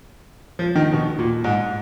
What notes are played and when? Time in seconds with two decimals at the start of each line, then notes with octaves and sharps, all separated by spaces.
0.59 F3
0.75 D#3
0.92 B2
1.19 A#2
1.44 G#2